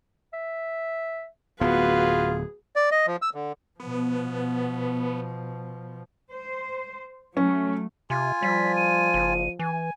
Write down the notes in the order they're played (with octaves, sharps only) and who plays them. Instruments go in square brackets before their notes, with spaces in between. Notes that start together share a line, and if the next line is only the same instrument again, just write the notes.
[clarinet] E5
[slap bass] D1 B3 [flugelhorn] F4 [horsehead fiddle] F#4 B4 [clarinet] G#4
[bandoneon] D5
D#5
F3
E6
D3
[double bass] B2 F3 [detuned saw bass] B3
[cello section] C5
[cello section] F#3 A3 [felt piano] C#4
[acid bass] C3 [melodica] F4 G#5
[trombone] F3 [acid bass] G3 [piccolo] B6
[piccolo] D#7
[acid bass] F#1
[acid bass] E3 [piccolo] G#5